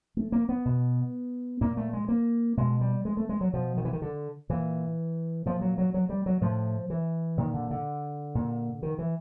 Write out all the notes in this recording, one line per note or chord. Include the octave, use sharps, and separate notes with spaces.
A3
A#3
B3
B2
A#2 A#3
A3
G#3
A#3
B2 G#3
G3
G#3
A3
G#3
F#3
B2 F3
D#3
E3
D#3
D3
A#2 E3
A#2 F3
F#3
F#3
F#3
G3
F#3
A2 F3
E3
A#2 D#3
D3
D3
A#2
D#3
E3